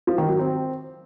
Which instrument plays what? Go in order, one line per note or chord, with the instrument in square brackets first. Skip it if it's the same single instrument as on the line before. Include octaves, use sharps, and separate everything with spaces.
[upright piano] F3
D#3
F#3
C4